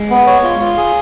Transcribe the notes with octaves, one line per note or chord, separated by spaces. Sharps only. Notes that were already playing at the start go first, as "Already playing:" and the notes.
Already playing: G#3
B3
C#5
F4
F4
G#4